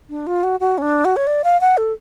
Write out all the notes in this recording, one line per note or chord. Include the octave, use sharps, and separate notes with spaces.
D4
F4
F#4
F#4
C#4
D4
F#4
C#5
D5
F5
F#5
A4